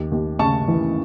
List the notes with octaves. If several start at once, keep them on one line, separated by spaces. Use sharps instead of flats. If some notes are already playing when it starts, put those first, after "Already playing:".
Already playing: D#2
D#2
C#3 A5 C#6
E3